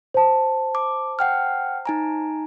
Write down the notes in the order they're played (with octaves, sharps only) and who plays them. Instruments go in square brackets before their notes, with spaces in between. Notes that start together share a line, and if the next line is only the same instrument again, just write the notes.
[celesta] C5 A5
[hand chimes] D6
F#5 G5 F6
D#4 G#5 A#5